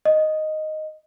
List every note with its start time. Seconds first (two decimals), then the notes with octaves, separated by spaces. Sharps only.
0.05 D#5